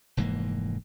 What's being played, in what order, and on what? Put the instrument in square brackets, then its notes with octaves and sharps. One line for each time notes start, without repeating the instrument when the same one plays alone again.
[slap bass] F1 G#2 E3 A#3